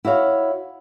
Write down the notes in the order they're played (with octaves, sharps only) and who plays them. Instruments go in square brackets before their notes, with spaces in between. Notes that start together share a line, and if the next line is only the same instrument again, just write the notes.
[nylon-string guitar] E4 F#4 C#5 F5